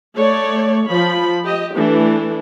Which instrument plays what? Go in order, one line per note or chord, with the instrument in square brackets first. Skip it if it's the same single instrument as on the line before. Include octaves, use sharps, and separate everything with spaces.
[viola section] A3 C#5 D5
F3 B5
G4 D#5
E3 A3 D4